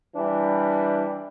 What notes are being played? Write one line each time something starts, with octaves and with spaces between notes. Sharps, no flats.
E3 G3 D4